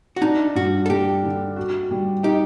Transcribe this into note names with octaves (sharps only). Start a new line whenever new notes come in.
F#4
D4 D#4
G2 F#4
A4
G3 G4
D3
F#4
G3
D#4 G4